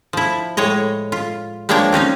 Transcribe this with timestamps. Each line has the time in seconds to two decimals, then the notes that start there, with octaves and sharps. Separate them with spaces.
0.13 F3 E4
0.57 A2 G#3 C#5 D#5
1.12 F4
1.69 F3 G#3 A#3 D4 C#5 G5
1.92 C4 C#4 D#4 F5